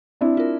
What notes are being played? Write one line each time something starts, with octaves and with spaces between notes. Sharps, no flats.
C4 D4 E4
F4 A#4